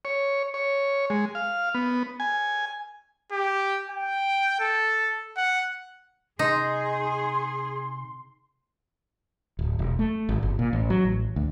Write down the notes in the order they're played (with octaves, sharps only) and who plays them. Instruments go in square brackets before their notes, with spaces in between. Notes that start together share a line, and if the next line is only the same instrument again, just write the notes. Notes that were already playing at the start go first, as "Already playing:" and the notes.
[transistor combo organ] C#5
C#5
G#3
F5
B3
G#5
[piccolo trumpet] G4
G5
A4
F#5
[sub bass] C3 [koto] D#4 [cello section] G#4 [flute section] C6
[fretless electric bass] D1
E1
A3
G#1
G1
A#2
A1
F#3
A1
D2